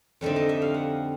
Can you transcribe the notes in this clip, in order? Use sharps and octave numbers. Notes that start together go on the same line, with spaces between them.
F2 D3 G3 C4 D#4 E5
D#5
E5
F5
F#5